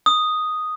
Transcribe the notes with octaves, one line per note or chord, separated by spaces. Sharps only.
D#6